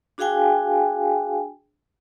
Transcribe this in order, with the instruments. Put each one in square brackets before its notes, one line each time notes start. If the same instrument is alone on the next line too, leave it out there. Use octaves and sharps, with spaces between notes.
[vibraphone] D4 F#4 G#4 F5 G5 G#5